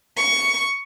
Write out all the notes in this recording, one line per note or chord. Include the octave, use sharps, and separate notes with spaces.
C#6